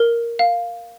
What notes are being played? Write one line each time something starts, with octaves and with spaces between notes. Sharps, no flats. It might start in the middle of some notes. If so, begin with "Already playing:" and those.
Already playing: A#4
F5